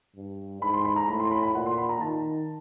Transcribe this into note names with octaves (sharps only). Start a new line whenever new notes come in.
G2
G#2 B5
C6
B5
A#5
A2 B5
C6
B5
B5
A#2 F#5
C6
B5
A#5
D#3 A5